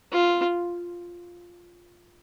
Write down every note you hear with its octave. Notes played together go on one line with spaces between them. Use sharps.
F4